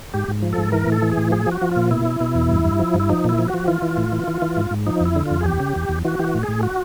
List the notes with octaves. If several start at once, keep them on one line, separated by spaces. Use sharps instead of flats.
G#2 G4
G#2
F3
G#2 A4
E3 A#4
A2
A4
E3
G#4
A2
F3 G#4
F3
F#4
F3
A#2 F4
B2 E4
B2
B2
E2
G2
G2
F3
G2
E4
F3 D#4
A#2 E4
F3
F#4
F3
E3 F4
E3
A2
E3
E3
E3
G#2
G#2
F3 D#4
F2 E4
D3
F2 F4
G#4
E2 G4
C#3
E2
E2
E3 F#4
E3 F#4 G4
A2
G#4
A2
F#4